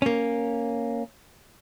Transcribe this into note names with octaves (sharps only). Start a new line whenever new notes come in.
A#3 C#4